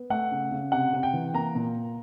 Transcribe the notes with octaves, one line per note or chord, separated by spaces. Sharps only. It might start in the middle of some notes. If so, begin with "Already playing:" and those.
Already playing: B3
A3 F#5
C#3
C#3
C3 F#5
C3
G5
E3
A#3 A#5
A#2